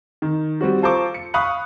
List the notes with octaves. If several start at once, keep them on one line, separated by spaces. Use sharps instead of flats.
D#3
G3 C4 F#4
F4 A4 C5 A#5 C#6 D6
C#7
F5 B5 C#6 D#6 F#6